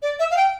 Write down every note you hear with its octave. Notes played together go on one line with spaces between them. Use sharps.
D5
E5
F5
G5